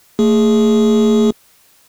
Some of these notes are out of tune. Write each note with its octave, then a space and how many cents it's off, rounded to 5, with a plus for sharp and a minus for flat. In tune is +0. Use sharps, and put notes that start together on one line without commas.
A3 +30 G#4 +0